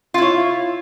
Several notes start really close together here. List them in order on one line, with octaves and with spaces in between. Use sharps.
F4 E4 C#5